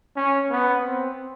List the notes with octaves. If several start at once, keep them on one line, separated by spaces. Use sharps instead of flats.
C#4
B3
C4